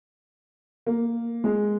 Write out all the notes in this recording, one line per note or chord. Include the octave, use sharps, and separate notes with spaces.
A#3
G#3